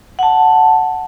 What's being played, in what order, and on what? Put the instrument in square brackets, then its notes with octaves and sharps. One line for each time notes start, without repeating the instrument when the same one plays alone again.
[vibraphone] F#5 A5